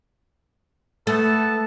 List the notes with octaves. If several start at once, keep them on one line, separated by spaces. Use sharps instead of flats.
A3 B3 A4 A5